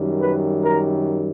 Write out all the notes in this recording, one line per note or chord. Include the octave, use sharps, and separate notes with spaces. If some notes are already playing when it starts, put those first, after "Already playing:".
Already playing: F#2 D#3 G3
B4
A#4